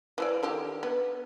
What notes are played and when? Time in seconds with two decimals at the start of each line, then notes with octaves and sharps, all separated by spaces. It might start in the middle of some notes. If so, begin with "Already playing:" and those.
0.18 E3 F3 D5
0.43 D3 D#3 G4
0.83 B3